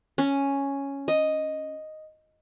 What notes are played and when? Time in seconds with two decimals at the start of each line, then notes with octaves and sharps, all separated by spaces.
0.18 C#4
1.08 D#5